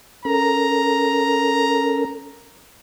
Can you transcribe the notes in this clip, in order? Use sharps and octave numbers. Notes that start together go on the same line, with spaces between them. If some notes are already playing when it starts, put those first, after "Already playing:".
C#4 A4 A#4 A#5